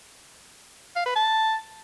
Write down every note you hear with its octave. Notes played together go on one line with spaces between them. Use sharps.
F5
B4
A5